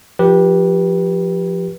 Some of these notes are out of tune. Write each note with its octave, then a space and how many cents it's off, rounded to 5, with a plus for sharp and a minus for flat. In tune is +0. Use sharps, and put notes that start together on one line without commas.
F3 +0 G4 +0 B4 -25